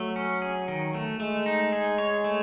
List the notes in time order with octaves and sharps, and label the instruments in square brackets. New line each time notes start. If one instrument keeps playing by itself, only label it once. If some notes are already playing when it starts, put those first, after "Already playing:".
Already playing: [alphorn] F#3 [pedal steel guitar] A3
[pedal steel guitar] C#4
G#4
D#3
A3
[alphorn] G#3 [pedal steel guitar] A3
[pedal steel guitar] D#4
G#4
C#5
A3